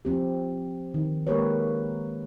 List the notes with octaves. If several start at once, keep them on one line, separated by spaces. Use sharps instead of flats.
F3 C4 G4
D#3
G#3 A#3 G4 A#4 B4 C#5